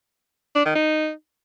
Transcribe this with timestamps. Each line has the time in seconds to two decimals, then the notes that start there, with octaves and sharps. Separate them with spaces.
0.56 D4
0.66 D#3
0.76 D#4